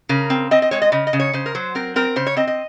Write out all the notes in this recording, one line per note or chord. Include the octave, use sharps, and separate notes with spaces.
C#3 A#4
C4
C4 D#5
D#5
G#3 C#5
D#5
C#3 D#5
D#5
C#3
C#5
C#3 C5
A#4
F#3 C5
C4 A#4
C4 A#4
C#3 C5
C#5
C4 D#5
D#5